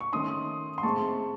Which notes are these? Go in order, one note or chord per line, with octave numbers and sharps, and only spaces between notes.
C#6
D#3 A3 C#4 C6 D#6
C6
A2 G#3 C4 A5 C#6